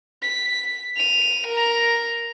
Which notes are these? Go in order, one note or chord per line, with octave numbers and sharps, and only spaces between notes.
B6
D#7 F7
A#4 A#5